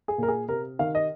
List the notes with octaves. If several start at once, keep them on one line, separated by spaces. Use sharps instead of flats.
G#4
A#2 A#4
G#4
C3 A#4
D#3 F5
D#5